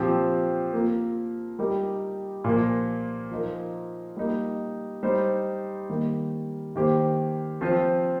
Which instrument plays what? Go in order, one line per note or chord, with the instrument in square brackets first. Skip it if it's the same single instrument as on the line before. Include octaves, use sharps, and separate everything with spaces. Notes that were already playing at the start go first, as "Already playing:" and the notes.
Already playing: [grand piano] A#2 F3 C4 G4
A#3 F4 A#4
G3 D#4 G4 A#4
A#2 F3 A#3
F3 D#4 A#4
G3 A#3 D#4
G3 D#4 C5
D#3 G3 A#3
D#3 A#3 G4 C5
F3 C4 F4 C5